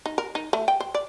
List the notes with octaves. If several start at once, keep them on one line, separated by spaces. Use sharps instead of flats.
D#4
A#4
D#4
A3
G5
C5
D5